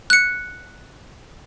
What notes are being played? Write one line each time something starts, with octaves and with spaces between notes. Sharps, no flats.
F#6 C#7